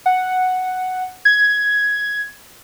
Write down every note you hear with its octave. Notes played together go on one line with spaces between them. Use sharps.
F#5
G#6